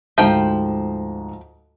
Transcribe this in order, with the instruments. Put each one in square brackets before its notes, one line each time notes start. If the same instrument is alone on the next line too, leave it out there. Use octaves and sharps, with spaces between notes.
[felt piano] D2 G#2 A#5 [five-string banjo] F3 G5